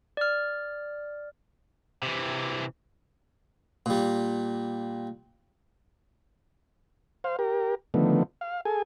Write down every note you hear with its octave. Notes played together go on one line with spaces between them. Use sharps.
D5 F6
C3 E3
A#2 G3
C5 F5
G4 A#4
D3 D#3 F3 A3 B3
F5
G#4 A4 G#5